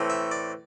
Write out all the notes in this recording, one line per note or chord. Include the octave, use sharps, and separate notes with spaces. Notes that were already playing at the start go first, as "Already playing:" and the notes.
Already playing: A2 E3 A3 C4
E5
D5